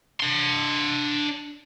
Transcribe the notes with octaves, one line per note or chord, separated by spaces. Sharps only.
D4 C6